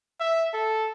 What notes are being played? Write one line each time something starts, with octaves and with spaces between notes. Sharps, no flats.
E5
A4